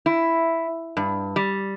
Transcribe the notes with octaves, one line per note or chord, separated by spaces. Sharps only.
E4
G2
G3